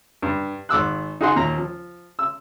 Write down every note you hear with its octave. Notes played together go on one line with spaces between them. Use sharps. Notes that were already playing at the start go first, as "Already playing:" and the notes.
G2
G#1 D6 E6 F#6
D#4 F#4 G#4 F#5 C6
D#2 A#2 A#5
F3
E6